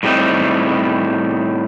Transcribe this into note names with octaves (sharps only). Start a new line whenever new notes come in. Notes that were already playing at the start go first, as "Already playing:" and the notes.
A2 G3 C4 D#4